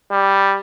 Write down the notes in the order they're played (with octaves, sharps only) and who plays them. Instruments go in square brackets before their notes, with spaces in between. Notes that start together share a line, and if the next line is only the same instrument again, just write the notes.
[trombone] G3